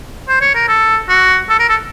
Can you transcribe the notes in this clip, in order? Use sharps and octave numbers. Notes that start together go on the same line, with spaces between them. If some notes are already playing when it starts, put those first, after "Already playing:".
C5
C#5
A#4
A4
F#4
A4
A#4
A4